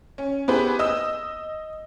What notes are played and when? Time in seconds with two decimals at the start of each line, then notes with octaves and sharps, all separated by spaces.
0.18 C#4
0.48 B3 E4 G4 G#4 B4 C5
0.79 D#5 D#6 E6